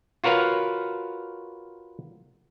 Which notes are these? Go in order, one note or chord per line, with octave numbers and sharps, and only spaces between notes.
F4 F#4 A#4 B4 C#5 F5